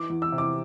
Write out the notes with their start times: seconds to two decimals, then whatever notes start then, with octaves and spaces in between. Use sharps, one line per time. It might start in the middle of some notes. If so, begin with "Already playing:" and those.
Already playing: E3 D6
0.10 E2
0.22 E6
0.32 C3
0.38 D6